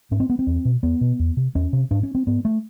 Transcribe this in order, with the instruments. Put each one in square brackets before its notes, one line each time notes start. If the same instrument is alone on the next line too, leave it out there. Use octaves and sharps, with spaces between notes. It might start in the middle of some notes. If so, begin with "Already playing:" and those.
[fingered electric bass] G#2 C#4
C4
B3
C4
E2
B2
E2 B3
B2
E2
C3
E2 C#4
C3
G#2 D4
C#4
C4
G#2 B3
A3